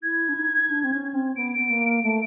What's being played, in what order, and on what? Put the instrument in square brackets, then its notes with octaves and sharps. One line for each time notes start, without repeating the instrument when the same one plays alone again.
[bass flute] E4 [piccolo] G#6
[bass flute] D4
D#4
D4
C4
C#4
C4
[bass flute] B3 [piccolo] D7
[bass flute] B3
A#3
A3